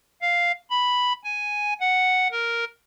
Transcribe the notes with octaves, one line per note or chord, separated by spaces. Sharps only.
F5
B5
G#5
F#5
A#4